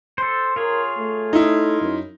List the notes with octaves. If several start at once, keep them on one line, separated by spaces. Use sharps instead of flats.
A4 C5
F4 G#4 A#4 C#5
A3
D#4 E4
F#2